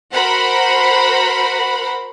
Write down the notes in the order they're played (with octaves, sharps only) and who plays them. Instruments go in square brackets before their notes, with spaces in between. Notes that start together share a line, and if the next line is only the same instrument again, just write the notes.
[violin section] F#4 A#4 C5 F#5 B5